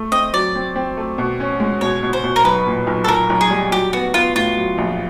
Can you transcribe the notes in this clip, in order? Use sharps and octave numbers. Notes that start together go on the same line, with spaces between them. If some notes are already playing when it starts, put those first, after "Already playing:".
Already playing: A3
C4 D#5
F#3 D5
C4
C4
A3
B2
C#4
G#3
B2 C#5
B2
C5
B2
A#4
B1 B4
A#2
B1
A4
B1 A#4
B1
G#4
G3
F#3 G4
B3 F#4
B3 F4
A2 F4
F#3
A#1